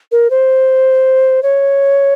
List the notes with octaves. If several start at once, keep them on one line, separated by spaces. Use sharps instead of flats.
A#4
C5
C#5